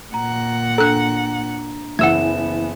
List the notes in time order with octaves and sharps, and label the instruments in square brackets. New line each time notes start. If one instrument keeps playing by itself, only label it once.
[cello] A#2 F#5 [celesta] A#5
[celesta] D4 A#5 [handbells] A4 F#6
[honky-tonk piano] F#1 E3 [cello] B3 [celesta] E5 E7 [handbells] F#5 E6 G#6